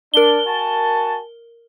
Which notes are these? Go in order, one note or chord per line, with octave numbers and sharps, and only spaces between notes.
D4 A#4 G7
F#4 G#5 A5